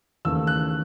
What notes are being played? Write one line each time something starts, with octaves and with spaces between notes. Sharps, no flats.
D#2 C#3 E3 A3 E6
F#6